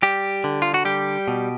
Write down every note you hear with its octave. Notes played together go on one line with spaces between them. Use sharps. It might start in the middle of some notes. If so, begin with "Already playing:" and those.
G3 G4
D3
F4
F#4
G3 G4
B2